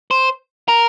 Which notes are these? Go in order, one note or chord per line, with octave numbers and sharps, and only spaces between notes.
C5
A#4